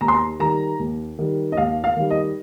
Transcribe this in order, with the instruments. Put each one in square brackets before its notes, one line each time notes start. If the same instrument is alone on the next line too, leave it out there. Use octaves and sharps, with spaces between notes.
[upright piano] D#2 A#5
C6
A#5
D#3 G3 A#5
D#2
D#3 G3
D#5
D#2 F5
F5
D#3 G3
D#5